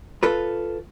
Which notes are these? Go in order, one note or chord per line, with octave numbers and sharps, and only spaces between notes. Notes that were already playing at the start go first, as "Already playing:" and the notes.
F4 A4 B4